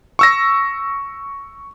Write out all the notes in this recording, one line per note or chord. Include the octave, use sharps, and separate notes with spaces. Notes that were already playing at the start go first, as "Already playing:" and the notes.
C#6 E6 A#6